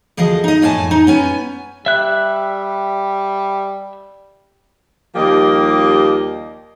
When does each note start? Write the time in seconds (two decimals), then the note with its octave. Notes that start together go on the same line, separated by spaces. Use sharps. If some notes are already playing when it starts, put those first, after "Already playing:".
0.17 D2 F3 G#4 A4 D#5
0.44 D#4 D#5
0.62 F2 A2 G#5 A5
0.91 D#4
1.07 B3 C#4 G#5
1.86 G3 E5 F#6
5.16 D#2 F3 G3 A#3 G4 D#5